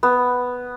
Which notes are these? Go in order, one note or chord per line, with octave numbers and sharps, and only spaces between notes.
B3